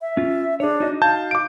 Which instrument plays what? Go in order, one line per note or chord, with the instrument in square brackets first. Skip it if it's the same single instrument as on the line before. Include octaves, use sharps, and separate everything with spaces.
[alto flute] E5
[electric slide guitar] C#4 F4
[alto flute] D4 [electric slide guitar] G#4 C#5
[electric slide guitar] D#4 F#4 D#5
[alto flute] F5 [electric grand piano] A5 G6
[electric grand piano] D6 D7